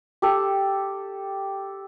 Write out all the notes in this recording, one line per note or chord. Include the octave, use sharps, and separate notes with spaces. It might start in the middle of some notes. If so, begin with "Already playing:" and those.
G4 A4